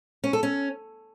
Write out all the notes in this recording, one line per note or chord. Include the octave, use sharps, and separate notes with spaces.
C#4
A4
C#4